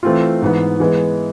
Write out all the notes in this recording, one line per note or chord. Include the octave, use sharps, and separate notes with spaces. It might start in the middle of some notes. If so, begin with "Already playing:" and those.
E3 A3 C4 F4
G#2 E3 B3
E3 G#3 B3